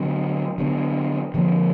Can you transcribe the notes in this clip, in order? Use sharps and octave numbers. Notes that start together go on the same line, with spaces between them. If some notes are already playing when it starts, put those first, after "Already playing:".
Already playing: D3 F#3 B3 D4
D3 F#3 B3 D4
D3 F3 A#3